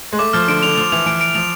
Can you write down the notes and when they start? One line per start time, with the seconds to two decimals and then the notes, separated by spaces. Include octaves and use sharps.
0.13 G#3
0.19 A3 D6
0.33 F3 F6
0.48 D3 D7
0.63 D3 F7
0.77 F3 F7
0.92 E3 F7
1.06 E3 D7
1.21 D7
1.35 F3 F7